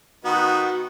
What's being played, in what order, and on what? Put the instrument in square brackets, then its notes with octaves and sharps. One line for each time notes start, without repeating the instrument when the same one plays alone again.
[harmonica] D#3 B3 D#4 [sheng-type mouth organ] F#4